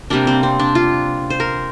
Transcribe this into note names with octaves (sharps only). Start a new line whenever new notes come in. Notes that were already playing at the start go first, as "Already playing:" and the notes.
C3 G3 A#3 D4
C4
C4
D4
F4
C5
A#4